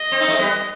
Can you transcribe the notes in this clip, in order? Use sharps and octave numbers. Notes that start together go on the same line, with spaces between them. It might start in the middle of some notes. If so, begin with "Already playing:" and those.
Already playing: D#5
C4
D#4
A3 C4
G3 B3